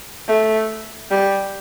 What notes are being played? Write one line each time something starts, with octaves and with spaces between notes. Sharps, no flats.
A3
G3